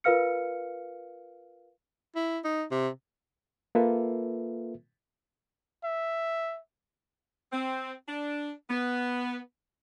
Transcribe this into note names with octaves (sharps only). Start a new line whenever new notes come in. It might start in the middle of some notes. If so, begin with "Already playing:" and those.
F4 A#4 B4 F5 F6 C#7
E4
D#4
C3
A#3 F4 A4 B4 E5
E5
C4
D4
B3